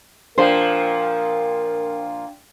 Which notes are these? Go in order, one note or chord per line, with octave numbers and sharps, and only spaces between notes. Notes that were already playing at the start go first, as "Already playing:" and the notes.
A#2 F3 D4 A#4 C5 F5 G5